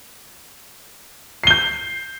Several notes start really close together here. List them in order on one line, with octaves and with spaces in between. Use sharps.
C7 G7 G6